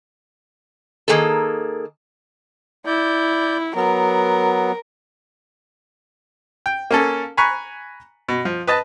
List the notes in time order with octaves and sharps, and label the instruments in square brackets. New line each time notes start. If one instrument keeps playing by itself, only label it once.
[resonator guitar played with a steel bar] D#3 A#3 G#4 A4
[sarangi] E4 [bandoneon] D5 G6
[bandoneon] F#3 B3 [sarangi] A#4
[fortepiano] G5
A#3 C#4 A4
G#5 A#5 B5 C#6 F#6
B2
F3
B4 D#5 A5